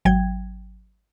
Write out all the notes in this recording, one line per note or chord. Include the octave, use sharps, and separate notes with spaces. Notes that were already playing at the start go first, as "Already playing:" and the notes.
G#1 F#3 G5 G#6